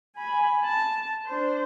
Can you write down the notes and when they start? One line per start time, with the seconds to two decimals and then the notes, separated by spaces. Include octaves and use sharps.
0.16 G#5 B5
0.64 A5
1.26 D4 C5